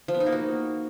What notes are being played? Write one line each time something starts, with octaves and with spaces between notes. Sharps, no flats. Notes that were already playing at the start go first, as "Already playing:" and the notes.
F3
B3
D#4
A#3
F#4